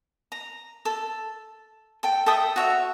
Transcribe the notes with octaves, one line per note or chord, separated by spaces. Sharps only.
A#5
A4
A4 G5
A4 E5 G5 D#6
F#4 C#5 E5